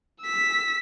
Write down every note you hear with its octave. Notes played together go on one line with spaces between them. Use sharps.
E6 B6